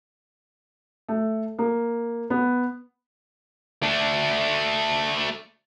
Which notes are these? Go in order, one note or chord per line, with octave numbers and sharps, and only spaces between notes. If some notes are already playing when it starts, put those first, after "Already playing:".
A3
A#3
B3
A3 D4